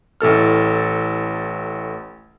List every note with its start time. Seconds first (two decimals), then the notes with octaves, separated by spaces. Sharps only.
0.21 A1 A2 A4 F6